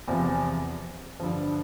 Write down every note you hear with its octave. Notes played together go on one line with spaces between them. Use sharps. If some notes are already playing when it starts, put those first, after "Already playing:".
E2 C3 F3
G2 D3 F3